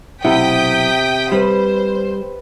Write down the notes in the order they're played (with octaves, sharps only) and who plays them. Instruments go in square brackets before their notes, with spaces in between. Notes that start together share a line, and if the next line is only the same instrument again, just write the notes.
[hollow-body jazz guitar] B1 E4 F#5 [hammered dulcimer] C3 [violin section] G5 D#6 B6
[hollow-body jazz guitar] G3 [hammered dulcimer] B4 [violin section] C5